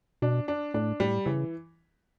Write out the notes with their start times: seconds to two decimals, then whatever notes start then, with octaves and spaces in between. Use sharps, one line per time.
0.22 B2 D4
0.48 D4
0.74 A2 D4
1.00 A2 G3
1.26 C#3 E3